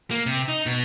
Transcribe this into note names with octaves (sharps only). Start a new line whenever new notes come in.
A#3
C3
D#4
B2